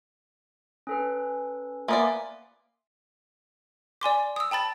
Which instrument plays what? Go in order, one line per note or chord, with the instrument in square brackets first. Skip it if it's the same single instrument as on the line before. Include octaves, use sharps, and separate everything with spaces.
[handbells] C#4 A4 B4
[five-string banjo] A#3 B3 D5 [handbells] E5 G#5 C6
[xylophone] D5 G#5 C6 D6
D#6 E6
G5 A5 B5 A6